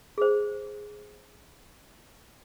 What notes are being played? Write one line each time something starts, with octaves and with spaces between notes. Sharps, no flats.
G#4 C5